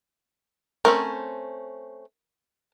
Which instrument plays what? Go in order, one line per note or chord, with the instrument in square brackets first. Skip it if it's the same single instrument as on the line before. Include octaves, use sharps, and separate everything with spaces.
[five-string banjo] A3 C4 C#4 [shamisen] A#4